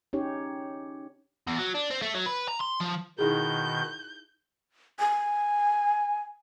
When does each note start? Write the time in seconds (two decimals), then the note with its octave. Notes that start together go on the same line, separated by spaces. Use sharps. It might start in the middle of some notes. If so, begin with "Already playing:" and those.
0.13 C#4 D#4 G4 C#5
1.47 E2
1.59 F#3
1.75 D4
1.91 C4
2.02 A3
2.14 F#3
2.26 B4
2.48 A#5
2.60 C6
2.80 F3
3.19 B2 D#3 D#4 E4 G#4 G6
4.99 G#5